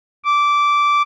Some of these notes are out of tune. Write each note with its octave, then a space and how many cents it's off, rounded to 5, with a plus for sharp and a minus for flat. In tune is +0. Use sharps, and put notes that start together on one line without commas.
D6 -10